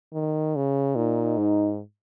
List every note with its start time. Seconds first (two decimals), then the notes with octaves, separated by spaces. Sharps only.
0.13 D#3
0.56 C#3
0.96 A#2 D#4
1.37 G#2